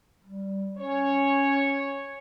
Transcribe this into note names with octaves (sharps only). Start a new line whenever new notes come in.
G3
C#4 C#5